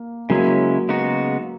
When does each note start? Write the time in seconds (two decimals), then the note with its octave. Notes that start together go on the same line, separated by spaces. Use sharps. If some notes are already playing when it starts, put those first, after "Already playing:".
Already playing: A#3
0.30 C#3 F#3 G#3 A#3 C#4 E4
0.89 C#3 G#3 B3 D#4 F#4